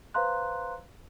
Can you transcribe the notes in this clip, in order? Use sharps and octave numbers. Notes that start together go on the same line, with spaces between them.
B4 C5 F5 A#5 C6 F#6